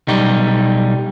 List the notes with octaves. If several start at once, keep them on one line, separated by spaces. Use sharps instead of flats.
B1 G3 D#4 G4